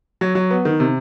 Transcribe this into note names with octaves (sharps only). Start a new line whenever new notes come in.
F#3
F#3
B3
D#3
C3